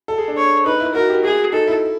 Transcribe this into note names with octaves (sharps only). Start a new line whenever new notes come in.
A4
G#4
D4
C#5
D#4 B4
E4
F#4 A#4
G4
F#4 G#4
D#4 A4
E4